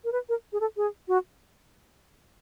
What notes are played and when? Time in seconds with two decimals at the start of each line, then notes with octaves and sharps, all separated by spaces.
0.04 A#4
0.12 B4
0.29 A#4
0.53 G#4
0.60 A4
0.77 G#4
1.08 F#4